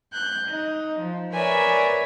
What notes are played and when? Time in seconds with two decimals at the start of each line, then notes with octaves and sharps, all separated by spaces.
0.12 F#6 G6
0.47 D#4
0.99 F3
1.34 A#4 B4 C#5 D5 E5 G#5